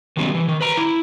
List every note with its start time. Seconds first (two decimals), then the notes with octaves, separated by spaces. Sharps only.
0.17 D#3 F#3 G3 B3 C#4
0.35 E3
0.48 D#3
0.61 B4 A#5
0.77 E4